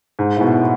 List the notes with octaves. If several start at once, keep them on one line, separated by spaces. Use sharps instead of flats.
G#2
A2
B2